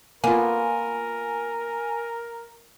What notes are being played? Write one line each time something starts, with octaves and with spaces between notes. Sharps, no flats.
A#3 B3 F4 A#4 G#5